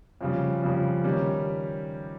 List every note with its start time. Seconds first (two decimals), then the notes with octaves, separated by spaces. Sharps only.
0.21 F2 C#3 G3
0.63 F2 C#3 G3
1.04 D#3 G3 C#4 G4